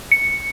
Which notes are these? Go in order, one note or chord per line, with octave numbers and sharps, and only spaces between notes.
C#7